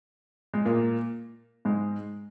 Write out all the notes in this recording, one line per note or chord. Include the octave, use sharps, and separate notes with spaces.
G#3
A#2 A#3
G#2 G#3